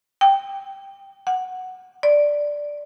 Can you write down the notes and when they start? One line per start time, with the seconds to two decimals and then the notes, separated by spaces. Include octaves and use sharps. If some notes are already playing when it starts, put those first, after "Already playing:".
0.21 G5
1.27 F#5
2.03 D5